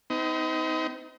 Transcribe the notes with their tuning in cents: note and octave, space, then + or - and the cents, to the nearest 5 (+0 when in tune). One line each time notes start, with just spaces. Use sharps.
C4 -40 D#4 +30